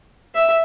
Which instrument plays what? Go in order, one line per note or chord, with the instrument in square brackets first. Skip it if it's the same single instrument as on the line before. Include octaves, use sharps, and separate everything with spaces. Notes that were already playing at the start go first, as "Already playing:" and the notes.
[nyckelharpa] E5